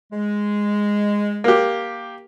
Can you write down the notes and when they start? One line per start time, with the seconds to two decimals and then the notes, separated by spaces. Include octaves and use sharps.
0.12 G#3
1.44 A#3 G4